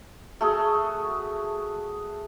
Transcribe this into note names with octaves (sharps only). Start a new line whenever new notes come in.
A3 F#4 G#4